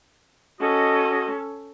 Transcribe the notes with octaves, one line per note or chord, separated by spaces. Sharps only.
C#4 F#4 A4 D#5